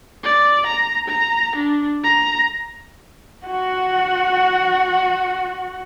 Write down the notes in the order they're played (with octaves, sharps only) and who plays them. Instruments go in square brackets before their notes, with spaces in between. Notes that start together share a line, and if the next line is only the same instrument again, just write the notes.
[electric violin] D5
A#5
A#5
D4
A#5
[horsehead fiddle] F#4 F#5